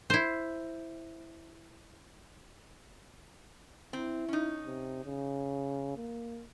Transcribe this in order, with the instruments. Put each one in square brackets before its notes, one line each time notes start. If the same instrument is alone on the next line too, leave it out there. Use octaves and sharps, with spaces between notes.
[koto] E4 C5
[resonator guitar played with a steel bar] C4 [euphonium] E4
[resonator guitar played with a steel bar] C#4 D#4
[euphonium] C3
C#3
A#3